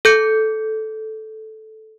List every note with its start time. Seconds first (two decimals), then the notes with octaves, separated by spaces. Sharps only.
0.05 A4 G6 C#7